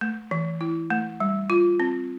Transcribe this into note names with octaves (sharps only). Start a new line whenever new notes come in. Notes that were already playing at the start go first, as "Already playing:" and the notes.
A3
E3
E4
A3
G3
F4
C4